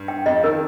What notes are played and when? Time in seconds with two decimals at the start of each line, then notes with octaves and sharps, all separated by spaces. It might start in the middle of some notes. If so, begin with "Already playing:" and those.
Already playing: G2
0.08 G5
0.26 F2 D#5
0.44 D#3 A#4